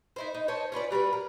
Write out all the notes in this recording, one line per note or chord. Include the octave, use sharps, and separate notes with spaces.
D#4 E4 C5
D#4
C5 C#5 D#5 A5
C#4 F4 B4 D5
F#3 G3 A#4 B4
A#4